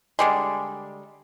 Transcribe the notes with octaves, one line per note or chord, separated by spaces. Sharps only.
D3 G3 G#3